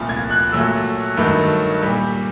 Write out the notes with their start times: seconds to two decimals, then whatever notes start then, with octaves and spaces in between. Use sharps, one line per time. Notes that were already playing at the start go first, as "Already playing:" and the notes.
Already playing: C2 A#2 F3 A3 A6
0.09 G#6
0.30 F#6
0.52 A#2 F#3 A3 E6
1.17 G2 D#3 F#3 A3
1.82 A#2 G3